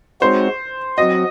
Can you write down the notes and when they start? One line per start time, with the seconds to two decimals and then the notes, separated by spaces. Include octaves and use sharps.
0.21 G#3 C4 D#4 F#4 C5 C#5
0.98 F#3 C4 F#4 D#5